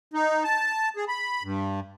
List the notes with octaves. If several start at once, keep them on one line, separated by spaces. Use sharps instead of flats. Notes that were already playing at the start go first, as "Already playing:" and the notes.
D#4
A5
G#4
B5
G2